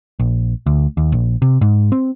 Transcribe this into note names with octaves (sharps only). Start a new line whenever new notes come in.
A#1
D2
D#2
A#1
C3
G#2
C4